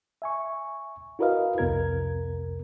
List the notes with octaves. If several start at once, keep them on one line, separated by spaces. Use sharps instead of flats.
E5 G#5 C#6
E4 F#4 A#4 B4 D#5 F5
C2 F2 C3 B3 A#4 G#6